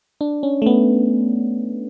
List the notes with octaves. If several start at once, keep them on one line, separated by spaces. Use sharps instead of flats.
D4
C#4
A3
B3